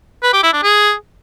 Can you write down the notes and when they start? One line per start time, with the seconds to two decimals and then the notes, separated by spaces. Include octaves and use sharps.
0.23 B4
0.33 G4
0.43 E4
0.53 D4
0.63 G#4